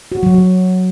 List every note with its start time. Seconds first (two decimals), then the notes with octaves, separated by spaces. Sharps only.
0.12 F#4
0.23 F#3
0.34 F#3